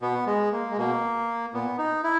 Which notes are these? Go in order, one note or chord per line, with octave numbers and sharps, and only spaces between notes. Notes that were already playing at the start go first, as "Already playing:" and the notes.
B2 B3
G#3
A#3
G#3
B2 A#3
A#2 B3
D#4
E4